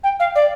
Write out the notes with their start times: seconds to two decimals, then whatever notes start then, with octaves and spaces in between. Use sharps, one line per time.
0.03 G5
0.19 F5
0.35 D5